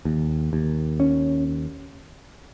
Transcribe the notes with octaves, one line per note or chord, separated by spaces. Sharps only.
D#2
D#2
C#4